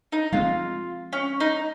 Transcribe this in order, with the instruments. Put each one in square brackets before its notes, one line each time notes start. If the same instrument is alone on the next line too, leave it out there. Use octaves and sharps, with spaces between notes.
[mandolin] D#4
[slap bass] F3 G#3 C4 [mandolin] F4
[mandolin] C#4
D#4